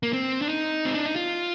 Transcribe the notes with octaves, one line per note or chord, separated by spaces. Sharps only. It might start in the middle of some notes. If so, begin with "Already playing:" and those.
A#3
C4
D4
D#4
C4
D4
D#4
F4